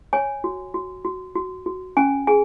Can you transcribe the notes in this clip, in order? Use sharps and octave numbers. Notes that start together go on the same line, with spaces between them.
C#5 G#5
F#4
F#4
F#4
F#4
F#4
C#4 G#5
G#4 G#5